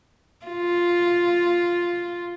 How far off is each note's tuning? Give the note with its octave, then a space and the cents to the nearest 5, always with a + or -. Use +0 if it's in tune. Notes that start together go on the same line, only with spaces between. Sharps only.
F4 +0